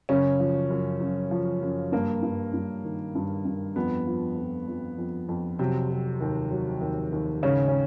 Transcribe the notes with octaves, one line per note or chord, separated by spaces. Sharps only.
F#2 C#3 C#4
F3
F#2
F#2
F3
F#2
G2 A#3
G2
G2
D#3
G2
G2
F2 B3
F3
F2
F2
F2
F2
C3 F#3 C4
F#3
D#2
F#3
D#2
D#2
G#2 C#3 C#4
C#4